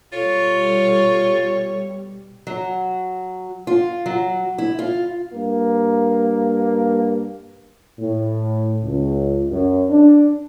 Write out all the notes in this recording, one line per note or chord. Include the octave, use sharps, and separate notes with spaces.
B2 G3 F4 A4 C#5
F#3
F4
F#3
E4
F4
G2 A#3
A2
C#2
F#2
D4